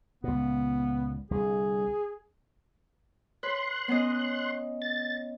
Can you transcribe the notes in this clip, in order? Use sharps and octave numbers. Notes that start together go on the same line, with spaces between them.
C#2 A#2 B3
C2 D3 G#4
B4 C#5 C6 F#6
B3 C#4 D#5
A6